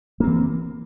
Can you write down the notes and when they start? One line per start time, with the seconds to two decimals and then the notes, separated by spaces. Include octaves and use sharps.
0.20 A#3
0.24 C4
0.27 E3